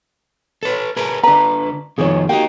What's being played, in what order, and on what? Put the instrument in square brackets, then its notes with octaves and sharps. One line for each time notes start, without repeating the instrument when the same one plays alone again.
[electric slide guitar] A4 B4
G#4 A#4 B4
[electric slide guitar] D3 B4 [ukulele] D4 A#5
[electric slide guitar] F2 D#3 F3 [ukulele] G#4 C#5
[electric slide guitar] A#3 D#4 [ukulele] F#4 G4 G5